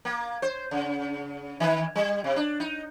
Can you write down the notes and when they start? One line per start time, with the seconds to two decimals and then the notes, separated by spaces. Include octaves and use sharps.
0.05 A#3
0.42 C5
0.71 C#3
1.60 D#3
1.96 G3
2.24 C3
2.36 D4
2.60 D#4